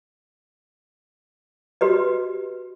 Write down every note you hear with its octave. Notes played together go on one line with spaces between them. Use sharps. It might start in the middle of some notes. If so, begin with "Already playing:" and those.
F#4 G4 B4 D#5